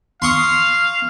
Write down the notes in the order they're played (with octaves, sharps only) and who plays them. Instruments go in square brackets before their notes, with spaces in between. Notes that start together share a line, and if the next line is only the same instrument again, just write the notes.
[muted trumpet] F5 [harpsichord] C6 C#6 D#6